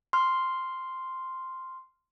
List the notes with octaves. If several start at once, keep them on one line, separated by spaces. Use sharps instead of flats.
C6 F6